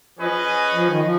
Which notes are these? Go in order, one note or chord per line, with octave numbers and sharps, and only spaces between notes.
F3 C#4 G#4 B4 D#5
F3
D#3
F3